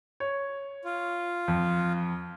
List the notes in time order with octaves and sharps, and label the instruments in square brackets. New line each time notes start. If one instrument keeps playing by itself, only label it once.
[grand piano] C#5
[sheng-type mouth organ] F4
[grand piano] F2